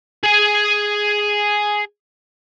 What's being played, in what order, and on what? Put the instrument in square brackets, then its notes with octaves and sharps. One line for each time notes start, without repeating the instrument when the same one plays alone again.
[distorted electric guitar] G#4 G#5